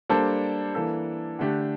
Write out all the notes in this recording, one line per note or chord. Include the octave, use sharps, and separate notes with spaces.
G3 A#3 D4 A4 C5
E3 A#3 D4 A4
D3 A3 D4 G4